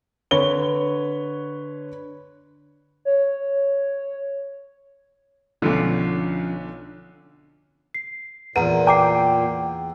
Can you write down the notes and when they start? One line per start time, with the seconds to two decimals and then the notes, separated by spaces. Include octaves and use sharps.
0.31 D3 B4 C#5 G7
3.05 C#5
5.62 B1 D3 F3 C#4 F4
7.94 C7
8.56 E2 A#2 B4 F#5 A#5 D#7
8.87 G5 A#5 D6 C7